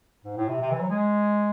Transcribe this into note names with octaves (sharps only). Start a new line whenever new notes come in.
G#2
A2
C3
C3
E3
F#3
G#3